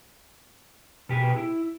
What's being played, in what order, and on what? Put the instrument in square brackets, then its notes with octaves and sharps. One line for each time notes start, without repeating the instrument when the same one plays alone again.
[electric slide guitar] B2 G4 G#4 B4
E4